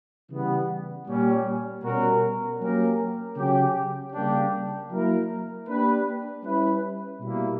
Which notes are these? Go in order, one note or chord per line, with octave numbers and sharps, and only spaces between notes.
C#3 E3 G3 B3
A#2 G3 C#4
B2 G3 C#4 F#4 A#4
F#3 A#3 C#4 G4 A#4
C#3 F#3 C#4 G4
C#3 G3 A#3 D4 G4
F#3 A#3 E4 A#4
A#3 D4 G4 B4
G3 C#4 E4 B4
B2 G3 A#3 E4